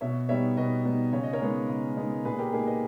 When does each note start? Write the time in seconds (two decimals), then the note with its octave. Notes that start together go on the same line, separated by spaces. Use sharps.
0.01 B2 C#5 E5
0.29 G3 B3 D#4 C#5 E5
0.57 B2 B4 D#5
0.85 G3 B3 D#4
1.13 C#3 C#5
1.23 D#5
1.33 A#4 C#5
1.41 G#3 B3 D#4
1.69 C#3
1.97 G#3 B3 D#4
2.25 A#2 G#4 B4
2.39 G4 A#4
2.52 A#3 D#4 G#4
2.67 B4 D#5